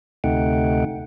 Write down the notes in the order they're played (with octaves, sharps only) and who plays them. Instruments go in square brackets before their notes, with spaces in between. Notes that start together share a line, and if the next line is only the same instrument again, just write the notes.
[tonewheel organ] D2 C3 A3 D#4 F#5 G5